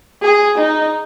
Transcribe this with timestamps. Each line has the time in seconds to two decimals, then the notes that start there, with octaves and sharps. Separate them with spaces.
0.22 G#4
0.58 D#4